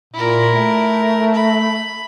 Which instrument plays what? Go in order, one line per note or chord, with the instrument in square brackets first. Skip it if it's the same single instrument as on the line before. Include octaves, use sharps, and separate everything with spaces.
[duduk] A#2 [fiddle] E4 A#4
[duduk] A3
[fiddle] B5